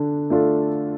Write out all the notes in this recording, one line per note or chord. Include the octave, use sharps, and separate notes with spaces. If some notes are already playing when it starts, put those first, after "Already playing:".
Already playing: D3 D4
A3 D4 F4 A4